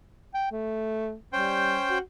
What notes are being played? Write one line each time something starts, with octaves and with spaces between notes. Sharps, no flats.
G5
A3
G3 C#4 C5 G5
F#4